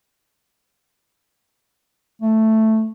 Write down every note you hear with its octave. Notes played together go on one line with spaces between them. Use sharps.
A3